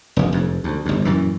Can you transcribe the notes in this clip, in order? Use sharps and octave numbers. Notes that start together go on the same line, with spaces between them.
F1 A#1
F1 F2
D2
G1 D2
F#2 A#2 E3